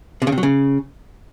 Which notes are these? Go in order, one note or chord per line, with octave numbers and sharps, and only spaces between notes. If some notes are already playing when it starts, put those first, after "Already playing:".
C3
C#3
C3
F#3
C#3